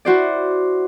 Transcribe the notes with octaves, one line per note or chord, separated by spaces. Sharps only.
E4 F#4 C5 D5